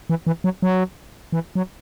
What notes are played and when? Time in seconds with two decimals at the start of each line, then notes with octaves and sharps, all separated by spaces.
0.10 E3
0.27 E3
0.44 F#3
0.62 F#3
1.32 E3
1.55 F#3